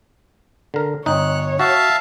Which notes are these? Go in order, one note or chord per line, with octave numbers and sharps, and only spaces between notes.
D3 A#4
G1 D#4 C#5 F#6
F#4 E5 F5 A5